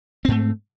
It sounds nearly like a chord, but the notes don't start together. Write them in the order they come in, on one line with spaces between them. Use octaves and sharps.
C4 G#2 A3